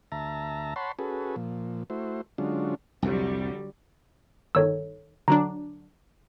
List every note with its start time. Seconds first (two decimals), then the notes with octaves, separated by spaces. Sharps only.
0.12 D2 E5 A5 A#5
0.76 C#5 F#5 A5 B5 C6
0.99 C#4 F#4 G#4 A4 B4
1.36 A#2 F3
1.90 A3 E4 F#4 C5
2.38 D3 F#3 G#3 C#4 D4 F4
3.02 C2 F2 D3 F#3 G3
4.55 G1 D#3 A4 C#5 E6
5.28 D3 F#3 D4 A#5